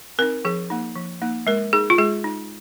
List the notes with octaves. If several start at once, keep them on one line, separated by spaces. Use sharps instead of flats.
C4 D#4 A#4
F3 G#4
A#3 D#4
F3
A#3 D#4
G#3 A#4
D#4 G#4
F4
G#3 G#4
D#4